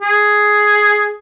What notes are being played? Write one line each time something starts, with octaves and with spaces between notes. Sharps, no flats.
G#4